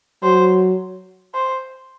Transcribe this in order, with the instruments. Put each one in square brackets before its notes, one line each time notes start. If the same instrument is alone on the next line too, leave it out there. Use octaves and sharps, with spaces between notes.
[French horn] F#3 [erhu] C5
[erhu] C5